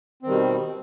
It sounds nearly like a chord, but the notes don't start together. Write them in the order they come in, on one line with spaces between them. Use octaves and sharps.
C4 D#3 G3 B2